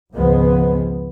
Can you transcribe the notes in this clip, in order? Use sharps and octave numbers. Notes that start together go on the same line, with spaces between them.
G#1 C#2 F3 G#3 B3